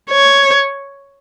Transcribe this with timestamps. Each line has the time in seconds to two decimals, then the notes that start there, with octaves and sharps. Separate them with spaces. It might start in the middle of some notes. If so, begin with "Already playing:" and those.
0.10 C#5